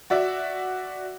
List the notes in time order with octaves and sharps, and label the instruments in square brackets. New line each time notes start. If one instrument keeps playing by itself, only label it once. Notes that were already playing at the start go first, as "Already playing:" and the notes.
[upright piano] F#4 D5 E5